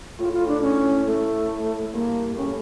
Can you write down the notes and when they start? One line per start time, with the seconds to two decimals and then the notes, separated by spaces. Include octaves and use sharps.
0.19 A2 F4
0.33 F4
0.40 A2
0.48 D4
0.62 A2 C#4
1.06 A3
1.93 G2 A#3
2.37 A2 C#4